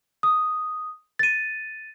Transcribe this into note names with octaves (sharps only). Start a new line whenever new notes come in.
D#6
A6 D#7